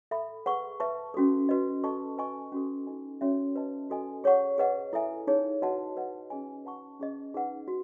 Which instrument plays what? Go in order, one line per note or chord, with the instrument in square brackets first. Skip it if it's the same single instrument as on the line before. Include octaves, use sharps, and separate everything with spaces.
[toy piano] A4 E5 B5
G#4 B4 F#5 C#6
B4 E5 A5 C#6
C#4 F#4 A4
F#4 B4 D#5
A4 D#5 A5 C#6
B4 D#5 G#5 C#6
C#4 F#4 A4
D#4 A4 D#5 G#5
C#4 F#4 A4 C#5 E5
B4 D#5 A5
F#4 A4 D#5 G#5
G#4 C#5 F#5 C#6
G#4 B4 D#5 F#5
E4 A4 E5 G#5
D#4 G#4 C#5
F#4 B4 D#5 F#5 A5
B4 D#5 F#5
C#4 G#4 D#5 G#5
B4 F#5 A5 C#6
C#4 G#4 D#5
D#4 G#4 B4 F#5
F#4